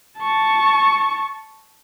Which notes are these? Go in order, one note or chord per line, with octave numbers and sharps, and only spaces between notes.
A5 C#6